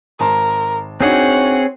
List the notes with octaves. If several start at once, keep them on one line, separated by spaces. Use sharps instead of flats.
G#1 A#4 A5 C6
C4 D4 D#4 F#4 G#4 C#5 F#5